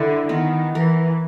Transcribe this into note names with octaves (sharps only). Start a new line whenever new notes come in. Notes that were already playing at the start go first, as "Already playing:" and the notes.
Already playing: D3 G3 E4
D#3 B3
E3 A#4